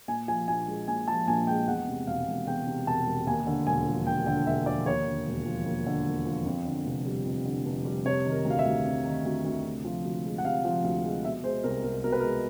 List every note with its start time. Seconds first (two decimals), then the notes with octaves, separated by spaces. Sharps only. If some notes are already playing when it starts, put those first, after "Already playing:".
0.08 A#2 G#5
0.28 F3 G#5
0.48 A#1 G#5
0.68 G#3
0.88 A#2 G#5
1.08 F3 A5
1.28 A#1 G#5
1.47 G#3 G5
1.68 E2 F#5
1.88 C3
2.07 E1 F5
2.27 E1
2.47 E2 G5
2.67 C3
2.87 E1 A5
3.07 E1
3.27 D#2 G#5
3.47 D3
3.67 E1 G#5
3.87 F3
4.07 D#2 G5
4.26 D3 G5
4.46 E1 E5
4.66 F3 D5
4.86 D#2 C#5
5.07 D3
5.27 E1
5.46 F3
5.66 D#2
5.86 D3
6.06 E1
6.26 F3
6.46 F2
6.65 D3
6.86 F1
7.06 G3
7.26 F2
7.45 D3
7.66 F1
7.85 G3
8.05 C3 C#5
8.25 D#3
8.32 A#4
8.45 D2
8.50 F5
8.59 E5
8.66 D2
8.85 C3
9.05 D#3
9.25 D2
9.45 D2
9.64 C3
9.85 F3
10.04 D2
10.24 G#3
10.38 F#5
10.45 C3 F5
10.65 F3
10.84 D2
11.04 G#3
11.24 B2 E5
11.44 G#3 C5
11.64 C2 A#4
11.84 C2 A#4
12.04 B2 A#4
12.12 B4
12.20 G#3 A#4